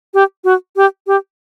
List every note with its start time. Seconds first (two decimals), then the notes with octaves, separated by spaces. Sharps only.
0.14 G4
0.44 F#4
0.76 G4
1.07 G4